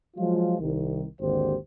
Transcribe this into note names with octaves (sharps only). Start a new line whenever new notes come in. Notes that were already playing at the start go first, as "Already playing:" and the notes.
F3 F#3 G#3 F4
C2 D#3
G#1 D#2 D3 G4 C5